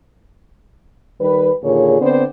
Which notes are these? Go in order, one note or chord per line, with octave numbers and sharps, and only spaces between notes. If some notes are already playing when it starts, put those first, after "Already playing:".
D#3 G3 B4
D#2 A#2 D3 G#4 C#5
D3 B3 C4 C5 D5